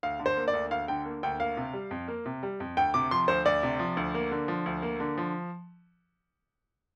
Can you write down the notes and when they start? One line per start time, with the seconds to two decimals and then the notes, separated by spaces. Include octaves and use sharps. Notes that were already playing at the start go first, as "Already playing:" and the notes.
0.03 D2 F5
0.19 D3
0.26 C5
0.37 A#3
0.48 D5
0.53 D2
0.71 D2 F5
0.88 D3 G5
1.05 A#3
1.23 D2 G5
1.40 A#3 F5
1.57 C3
1.73 G3
1.91 F2
2.08 A#3
2.26 C3
2.43 G3
2.60 F2
2.77 D2 G5
2.94 C3 D6
3.11 F3 C6
3.28 D2 C5
3.45 D2 D5
3.63 C3
3.79 F3
3.97 D2
4.15 A#3
4.31 D3
4.48 F3
4.66 D2
4.82 A#3
5.00 D3
5.17 F3